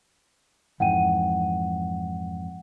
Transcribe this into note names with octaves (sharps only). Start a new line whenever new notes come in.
F2 G#2 E3 F#5 G5 D#7